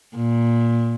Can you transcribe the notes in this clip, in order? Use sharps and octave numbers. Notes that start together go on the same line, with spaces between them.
A#2